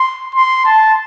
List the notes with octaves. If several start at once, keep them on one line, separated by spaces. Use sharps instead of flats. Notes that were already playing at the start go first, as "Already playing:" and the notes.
Already playing: C6
C6
A5